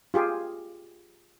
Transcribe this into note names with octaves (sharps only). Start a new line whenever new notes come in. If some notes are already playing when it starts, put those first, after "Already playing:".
F4 G4 G#4